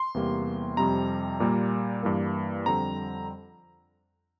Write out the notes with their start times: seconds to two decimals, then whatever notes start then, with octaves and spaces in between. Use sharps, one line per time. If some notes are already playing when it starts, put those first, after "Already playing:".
Already playing: C6
0.14 E2 C3 G3 A#3
0.77 F2 C3 G3 C4 A#5
1.40 A#2 G3 A#3
2.03 G2 E3 A#3
2.66 F2 D3 G3 C4 A#5